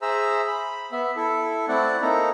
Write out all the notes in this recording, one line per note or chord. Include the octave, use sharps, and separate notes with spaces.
G#4 C5 E5 A#5 E6
B5
B3 E5
E4 A4
A3 C4 E4 D5 F#5
A#3 C4 D#4 E4 A4 A#5